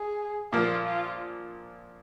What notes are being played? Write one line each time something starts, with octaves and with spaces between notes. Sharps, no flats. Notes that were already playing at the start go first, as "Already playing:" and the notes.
Already playing: G#4
A#2 F3 A#3 F4
F4